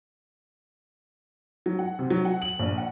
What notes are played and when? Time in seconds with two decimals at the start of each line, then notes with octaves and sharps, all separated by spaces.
1.66 F#3
1.79 F#5
1.99 C3
2.10 F#3
2.25 F#5
2.42 F#7
2.60 A#1
2.78 F#5